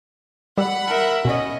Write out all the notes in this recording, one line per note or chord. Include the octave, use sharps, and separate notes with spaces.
G3 G4 F#5 B5 E6
A#4 E5
B2 C#4 D#5